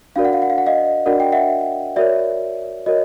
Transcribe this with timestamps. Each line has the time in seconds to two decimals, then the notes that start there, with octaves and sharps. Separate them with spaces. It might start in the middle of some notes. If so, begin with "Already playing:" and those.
0.16 D4 F#4 A#4 D5 F5
0.25 F#5
0.33 F5
0.42 F#5
0.50 F5
0.58 F#5
0.66 D#5 F5
1.06 D4 F#4 A#4 D5 F#5
1.20 G5
1.32 E5 F#5
1.96 F#4 A#4 C#5 D5 E5
2.86 F#4 A#4 C#5 D#5